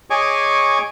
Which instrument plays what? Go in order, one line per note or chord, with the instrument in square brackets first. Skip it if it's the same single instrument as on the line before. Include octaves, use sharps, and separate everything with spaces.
[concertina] G#4 C#5 D#5 G#5 C#6 D6